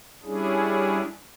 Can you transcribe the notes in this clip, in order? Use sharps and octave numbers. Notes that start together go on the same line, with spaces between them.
G3 C#4 D4 E4 G#4